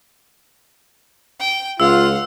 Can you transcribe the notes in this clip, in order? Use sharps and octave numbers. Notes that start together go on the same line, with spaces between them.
G5
C#2 F4 F5 F#5 E6